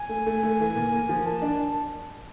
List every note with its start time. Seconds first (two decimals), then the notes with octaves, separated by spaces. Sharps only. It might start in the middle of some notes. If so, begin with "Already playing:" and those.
Already playing: G#5
0.09 A3
0.26 A3
0.43 A3
0.60 E3
0.76 A#2
0.92 A#3
1.09 F3
1.26 A#3 A5
1.42 D4